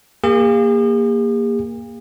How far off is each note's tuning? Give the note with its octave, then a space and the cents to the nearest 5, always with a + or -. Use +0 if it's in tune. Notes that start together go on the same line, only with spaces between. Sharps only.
A#3 +0 G#4 -45